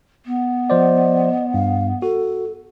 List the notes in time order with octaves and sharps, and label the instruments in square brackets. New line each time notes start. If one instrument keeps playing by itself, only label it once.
[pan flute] B3
[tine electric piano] F3 C5 D5 [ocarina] D#5
[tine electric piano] G2 [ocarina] F5
[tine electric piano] F#4 [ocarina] A4